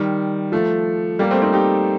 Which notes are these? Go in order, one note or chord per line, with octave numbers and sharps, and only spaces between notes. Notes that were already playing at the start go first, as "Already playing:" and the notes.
Already playing: D#3 G3
F3 A3
G3 A#3
A3 C4
C4 D#4
D#4 G4